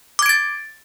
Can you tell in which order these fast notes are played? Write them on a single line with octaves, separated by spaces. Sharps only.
D6 G#6 D7 A6